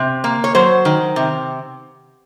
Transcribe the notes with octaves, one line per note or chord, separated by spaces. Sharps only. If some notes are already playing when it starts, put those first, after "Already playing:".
Already playing: C3
A#3
C#5
F#3 C5
D#3
C3